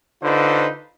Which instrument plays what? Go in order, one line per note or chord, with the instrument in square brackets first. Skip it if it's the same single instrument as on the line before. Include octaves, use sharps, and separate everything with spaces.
[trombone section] D3 D#4 F4 B4 C5